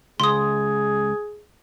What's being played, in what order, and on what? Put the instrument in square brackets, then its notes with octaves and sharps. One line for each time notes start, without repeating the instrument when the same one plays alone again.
[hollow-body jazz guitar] C#2 [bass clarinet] G#4 [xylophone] C6 D#6